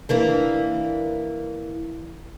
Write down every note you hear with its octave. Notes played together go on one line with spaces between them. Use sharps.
E3 A#3 D4